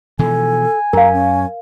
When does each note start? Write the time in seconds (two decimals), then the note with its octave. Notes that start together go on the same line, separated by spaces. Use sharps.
0.19 B2 E3 F3 A4 G#5
0.93 F#2 A#4 F5 A#5
1.14 C#4